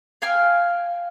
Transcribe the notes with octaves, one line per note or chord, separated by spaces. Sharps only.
F5 G5 G#5 F6